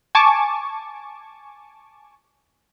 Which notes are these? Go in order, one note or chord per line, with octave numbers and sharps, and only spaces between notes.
G#5 A5 C#6 D6